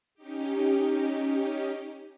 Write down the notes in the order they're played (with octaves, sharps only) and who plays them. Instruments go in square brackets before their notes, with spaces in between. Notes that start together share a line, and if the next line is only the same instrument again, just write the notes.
[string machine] C#4 D#4 G4